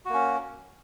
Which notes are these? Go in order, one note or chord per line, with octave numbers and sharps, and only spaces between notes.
A#3 C#4 F#4